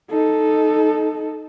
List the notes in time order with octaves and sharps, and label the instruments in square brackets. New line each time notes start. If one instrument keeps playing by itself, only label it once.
[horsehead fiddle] D#4 A4